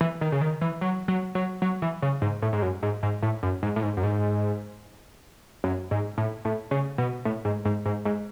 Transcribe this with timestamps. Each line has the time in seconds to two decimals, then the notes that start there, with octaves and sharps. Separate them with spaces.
0.01 E3
0.21 D#3
0.32 C#3
0.41 D#3
0.61 E3
0.81 F#3
1.08 F#3
1.35 F#3
1.62 F#3
1.82 E3
2.02 C#3
2.22 G#2
2.42 A2
2.53 G#2
2.62 F#2
2.83 G#2
3.03 G#2
3.23 A2
3.43 F#2
3.63 G#2
3.76 A2
3.83 G#2
3.97 F#2
4.03 G#2
5.64 F#2
5.91 G#2
6.18 A2
6.45 A2
6.71 C#3
6.98 B2
7.25 A2
7.45 G#2
7.65 G#2
7.86 G#2
8.05 G#2